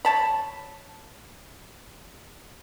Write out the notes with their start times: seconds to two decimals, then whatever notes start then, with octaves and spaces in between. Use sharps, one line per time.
0.05 C#5 A5 B5